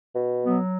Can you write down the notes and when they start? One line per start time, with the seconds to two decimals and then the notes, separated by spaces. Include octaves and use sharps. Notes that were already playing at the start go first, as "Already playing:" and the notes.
0.15 B2
0.44 F#3 B3